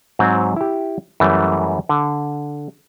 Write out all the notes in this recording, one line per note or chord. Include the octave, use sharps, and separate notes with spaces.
G#2 F#3 C4
E4 G4
F#2 E3 G3 A3
D3